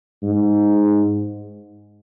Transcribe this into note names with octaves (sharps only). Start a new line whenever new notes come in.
G#2